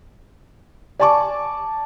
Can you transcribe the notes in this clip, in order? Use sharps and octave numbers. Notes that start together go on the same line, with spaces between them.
D5 G#5 A5 C#6 D6